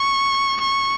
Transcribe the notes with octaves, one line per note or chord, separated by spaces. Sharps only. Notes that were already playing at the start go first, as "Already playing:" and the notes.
Already playing: C#6
C#6